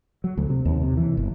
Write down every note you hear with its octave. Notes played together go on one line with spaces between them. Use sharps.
F#3
D2
C3
D#2
C3
E3
G1